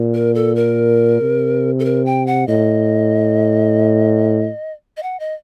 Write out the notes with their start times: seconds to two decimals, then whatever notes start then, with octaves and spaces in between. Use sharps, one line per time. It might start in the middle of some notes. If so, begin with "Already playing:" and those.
Already playing: A#2
0.14 A#4
0.35 A4
0.56 A#4
1.21 C3
1.80 A4
1.85 A#4
2.06 G5
2.27 F#5
2.48 A2 D#5
4.97 D#5
5.03 F#5
5.20 D#5